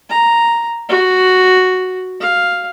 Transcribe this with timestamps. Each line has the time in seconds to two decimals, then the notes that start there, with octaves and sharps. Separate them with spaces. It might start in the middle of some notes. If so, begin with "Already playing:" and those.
0.10 A#5
0.89 F#4
2.21 F5